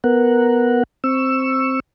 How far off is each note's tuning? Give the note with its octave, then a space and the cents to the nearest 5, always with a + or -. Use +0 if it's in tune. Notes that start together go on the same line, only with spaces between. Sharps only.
B3 +0 A#4 +0 F#5 -5
C4 +5 C#6 +0 E6 +10